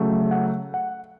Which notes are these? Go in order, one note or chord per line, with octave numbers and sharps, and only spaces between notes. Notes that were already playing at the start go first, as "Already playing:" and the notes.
Already playing: C#3 F#3 A3
F#5
F#5